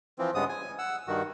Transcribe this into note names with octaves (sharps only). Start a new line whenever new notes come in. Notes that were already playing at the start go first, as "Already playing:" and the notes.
E3 F3 C4
G2 C#3 G#3 B3 D#6
G#5
F#5 E6
G2 D#3 F#4